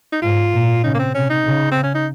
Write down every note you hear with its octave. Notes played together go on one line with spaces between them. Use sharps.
D#4
G#2 F4
A#2
C#3 D#4
A#3
C4
C3 C#4
D#4
C#3
C4
C#4
D#4